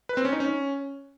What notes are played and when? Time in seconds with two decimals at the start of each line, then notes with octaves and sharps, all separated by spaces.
0.09 B4
0.17 C4
0.25 C#4
0.32 D#4
0.40 C#4